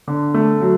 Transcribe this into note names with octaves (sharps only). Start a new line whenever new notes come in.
D3
A3
F#3